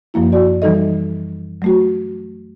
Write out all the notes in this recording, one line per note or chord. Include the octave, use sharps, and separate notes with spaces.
F#2 F3 A#3 E4
F#4 D5
E3 G3 D#4 A4 D#5
F#3 A3 F#4